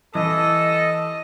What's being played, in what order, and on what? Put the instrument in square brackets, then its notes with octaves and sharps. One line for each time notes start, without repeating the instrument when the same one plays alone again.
[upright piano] E3 [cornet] A4 [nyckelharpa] D#5